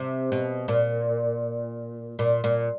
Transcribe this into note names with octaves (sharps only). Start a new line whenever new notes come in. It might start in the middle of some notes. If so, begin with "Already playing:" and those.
Already playing: C3
B2
A#2
A#2
A#2